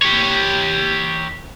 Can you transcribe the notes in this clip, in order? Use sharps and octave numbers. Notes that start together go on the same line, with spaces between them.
G4 C#5